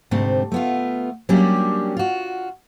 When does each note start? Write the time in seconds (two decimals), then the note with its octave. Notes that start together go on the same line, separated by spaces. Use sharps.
0.11 D2 G#2 C3 A3 C4
0.52 A3 B3 F4
1.29 F#3 G3 A#3 C#4 D4 G4
1.97 F4 F#4